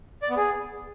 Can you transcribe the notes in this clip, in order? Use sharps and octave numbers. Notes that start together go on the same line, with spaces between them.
D5
B3
G#4